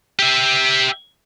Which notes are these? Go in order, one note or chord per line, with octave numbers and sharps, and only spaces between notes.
G4 E5